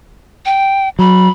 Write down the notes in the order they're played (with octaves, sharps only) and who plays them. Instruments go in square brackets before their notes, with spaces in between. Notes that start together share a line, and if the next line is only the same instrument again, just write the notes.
[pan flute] G5
[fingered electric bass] F#3 [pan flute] B5